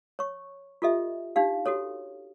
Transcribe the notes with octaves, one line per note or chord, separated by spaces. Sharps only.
C#5 C#6
F4 G4 A4 D#5 E5
D4 D#4 G4 F5
F#4 G4 A4 C#5